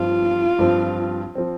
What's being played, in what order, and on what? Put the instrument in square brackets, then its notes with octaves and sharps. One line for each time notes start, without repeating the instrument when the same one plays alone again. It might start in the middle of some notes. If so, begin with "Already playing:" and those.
Already playing: [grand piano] G2 F3 C4 [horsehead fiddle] F4
[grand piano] G2 F3 C4
F3 C4